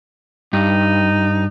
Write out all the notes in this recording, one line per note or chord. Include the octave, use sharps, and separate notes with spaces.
G2 D#4